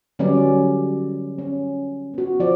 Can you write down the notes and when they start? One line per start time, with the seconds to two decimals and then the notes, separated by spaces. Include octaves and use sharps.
0.19 D3 F#3 G3 C#4 B4 D5
1.39 C#4
2.14 B3 F#4
2.40 F3 D5